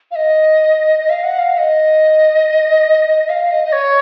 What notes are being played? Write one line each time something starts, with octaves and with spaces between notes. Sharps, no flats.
F5
D#5
D#5
F5
F#5
F5
F5
D#5
F5
D#5
D#5
C#5